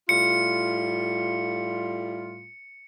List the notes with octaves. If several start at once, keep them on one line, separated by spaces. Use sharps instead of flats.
A2 G3 F4 C#7